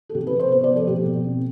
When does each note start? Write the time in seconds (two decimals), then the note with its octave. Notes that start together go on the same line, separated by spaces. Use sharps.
0.09 A4
0.15 C3 G4
0.27 B4
0.32 C3
0.39 C5
0.51 B3 C5
0.64 D5
0.69 F3
0.76 A4
0.87 B2 G4
1.05 B2
1.24 C4